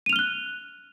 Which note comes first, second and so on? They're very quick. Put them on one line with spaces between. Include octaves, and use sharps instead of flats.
D#7 F7 F6 G7 F#6